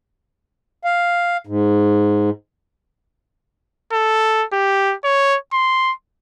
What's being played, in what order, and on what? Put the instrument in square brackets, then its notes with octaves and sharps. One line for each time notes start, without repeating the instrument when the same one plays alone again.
[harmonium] F5
G#2
[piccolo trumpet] A4
G4
C#5
C6